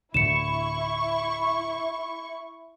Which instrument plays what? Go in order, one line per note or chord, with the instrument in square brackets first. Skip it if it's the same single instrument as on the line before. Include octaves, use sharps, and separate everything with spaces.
[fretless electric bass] D2 A2 D3 [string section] E4 C#6 [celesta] C#7 E7